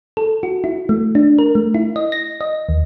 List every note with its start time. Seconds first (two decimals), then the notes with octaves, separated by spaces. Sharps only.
0.17 A4
0.43 F#4
0.64 E4
0.89 A3
1.15 D4
1.39 A#4
1.55 A3
1.75 E4
1.96 D#5
2.12 A#6
2.41 D#5
2.69 D#2